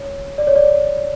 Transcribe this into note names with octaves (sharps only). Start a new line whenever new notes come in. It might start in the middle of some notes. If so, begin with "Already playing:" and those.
Already playing: C#5
D5
C#5
D5